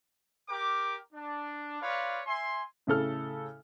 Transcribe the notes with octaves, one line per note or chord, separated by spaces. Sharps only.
G4 A#4 G5 D6
D4
F4 B4 C#5 D5 F5
E5 G#5 C6
A2 C#3 A4 F6